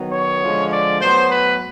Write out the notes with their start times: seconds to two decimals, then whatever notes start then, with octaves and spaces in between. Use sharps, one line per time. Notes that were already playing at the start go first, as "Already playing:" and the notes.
Already playing: D#3 F#3 B3
0.13 C#5
0.42 D3 F3 G#3
0.72 D5
1.01 A2 F#3 B3 C5
1.30 B4